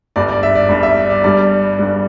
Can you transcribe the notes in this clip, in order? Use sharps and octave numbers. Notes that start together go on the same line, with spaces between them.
G1 G2 G3 D5
D5
E5
D5
G1 G2 G3
E5
D5
D5
G1 G2 G3 D5
G1 G2 G3